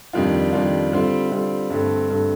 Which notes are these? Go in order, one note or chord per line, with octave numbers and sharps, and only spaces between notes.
F2 D#3 G3 D4 F4
F2 D#3 G3 D4 F4
D3 G3 C4 F4
D3 G3 C4 F4
G2 D3 A3 C4
G2 D3 A3 C4